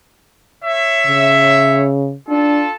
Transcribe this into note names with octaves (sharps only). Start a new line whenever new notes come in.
C#5 E5
C#3
D4 F4 A4 A5